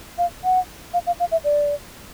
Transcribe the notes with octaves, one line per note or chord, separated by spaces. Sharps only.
F5
F#5
F5
F5
F5
E5
D5